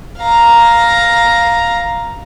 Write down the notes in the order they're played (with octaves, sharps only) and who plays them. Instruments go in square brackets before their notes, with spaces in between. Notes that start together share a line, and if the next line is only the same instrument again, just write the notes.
[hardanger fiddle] F5 A#5